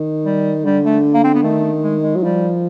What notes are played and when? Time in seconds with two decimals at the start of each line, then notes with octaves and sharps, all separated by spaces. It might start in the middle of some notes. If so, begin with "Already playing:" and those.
Already playing: D#3
0.25 G3
0.65 D3 G3
0.85 A3
1.14 A#3
1.24 C4
1.34 B3
1.43 D#3 A3
1.83 G#3
2.03 G#3
2.16 F#3
2.22 F3 G3